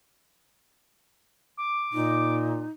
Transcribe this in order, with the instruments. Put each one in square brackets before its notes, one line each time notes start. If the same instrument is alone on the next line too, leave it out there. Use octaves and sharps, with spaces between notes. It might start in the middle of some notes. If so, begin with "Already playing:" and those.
[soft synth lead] D6
[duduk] A#2 [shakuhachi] D#4